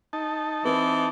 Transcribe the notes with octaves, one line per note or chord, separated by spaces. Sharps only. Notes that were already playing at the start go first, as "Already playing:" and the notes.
D#4 A5
E3 C4 B4